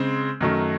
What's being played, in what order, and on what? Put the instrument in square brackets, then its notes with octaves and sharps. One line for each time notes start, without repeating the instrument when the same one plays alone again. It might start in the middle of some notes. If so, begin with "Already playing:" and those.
Already playing: [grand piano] C#3 G#3 C4
F#2 D#3 F#3 A3